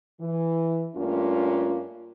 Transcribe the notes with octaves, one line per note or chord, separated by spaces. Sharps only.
E3
G2 A3 A#3 C#4 F4